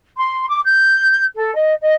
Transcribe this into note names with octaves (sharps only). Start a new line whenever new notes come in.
C6
D6
G6
A4
D#5
D#5